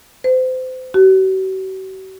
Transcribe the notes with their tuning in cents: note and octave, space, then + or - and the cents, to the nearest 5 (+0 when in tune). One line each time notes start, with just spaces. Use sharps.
C5 -30
F#4 +45